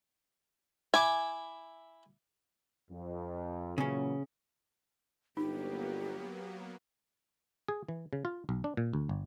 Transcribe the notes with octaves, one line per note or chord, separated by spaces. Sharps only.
E4 E5 G#5 D6
F2
A#2 C#3 E3 F#3 C#4
G1 F#3 A#3 B3 D#4 G4
G#4
E3
C#3
F4
B1
D4
A#2
D2
G1